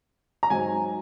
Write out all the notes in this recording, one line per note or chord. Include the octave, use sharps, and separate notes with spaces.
A#5
G#2 F#3 C4 D#4 G#5